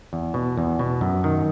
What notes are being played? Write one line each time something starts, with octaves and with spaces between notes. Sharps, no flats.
E2
B2
E2
B2
F#2
D#3